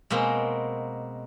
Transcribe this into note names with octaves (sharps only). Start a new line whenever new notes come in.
B2 G#3 A#3 C4